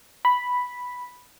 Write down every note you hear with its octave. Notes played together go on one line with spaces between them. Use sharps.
B5